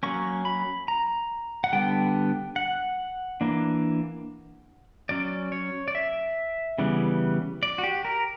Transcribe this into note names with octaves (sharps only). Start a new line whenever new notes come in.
F#3 A#3 C#4 C#6
B5
A#5
F#5
D3 G3 B3 D4 G5
F#5
E3 A#3 D4
F#3 C#4 D5
C#5
D5
E5
C#3 E3 G3 B3
D5
F#4
G4
A#4